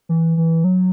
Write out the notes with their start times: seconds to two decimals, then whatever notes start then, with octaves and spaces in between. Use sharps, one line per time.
0.09 E3
0.37 E3
0.64 F#3